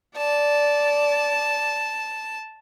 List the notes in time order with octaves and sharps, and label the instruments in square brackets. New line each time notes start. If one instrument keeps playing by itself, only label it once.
[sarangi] D5 [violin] A5